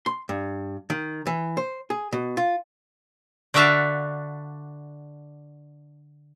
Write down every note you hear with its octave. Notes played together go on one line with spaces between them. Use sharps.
C6
G2
D#3
E3
C5
G#4
B2
F4
D3 D4 F#4 E5 F5